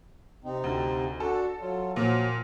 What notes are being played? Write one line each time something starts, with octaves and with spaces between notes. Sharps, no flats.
C3 C4 D#4
D2
D4 F#4 A4
F#3 F4
A#2 F3 F#3